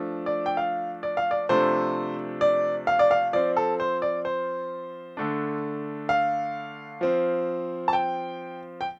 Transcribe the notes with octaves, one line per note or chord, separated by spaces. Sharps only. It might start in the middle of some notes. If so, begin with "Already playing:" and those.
Already playing: F3 A3 D4
D5
G5
F5
D5
F5
D5
C3 F3 A3 D4 C5
D5
F5
D5
F5
F3 C4 D5
A4
C5
D5
C5
D3 A3 D4
F5
F3 C4
A5
G5
G5